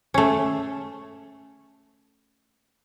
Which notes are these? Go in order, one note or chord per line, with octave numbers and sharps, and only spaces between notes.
A3 C#4